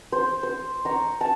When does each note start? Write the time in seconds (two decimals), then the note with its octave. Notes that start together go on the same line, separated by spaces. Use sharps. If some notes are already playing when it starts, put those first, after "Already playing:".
0.12 C5
0.43 C5
0.85 A#5 C#6
1.21 A5